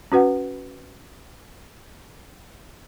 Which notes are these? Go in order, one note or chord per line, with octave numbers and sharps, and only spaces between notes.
C#4 F#4 B4 F#5